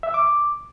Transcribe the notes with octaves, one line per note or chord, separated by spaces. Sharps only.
E5
E6
D6